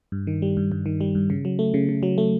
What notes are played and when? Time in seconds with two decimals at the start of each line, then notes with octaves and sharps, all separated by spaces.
0.12 G2
0.27 D#3
0.42 G3
0.57 G2
0.72 G2
0.86 D#3
1.01 G3
1.15 G2
1.30 C#3
1.45 F#3
1.59 A3
1.74 C#3
1.89 C#3
2.03 F#3
2.18 A3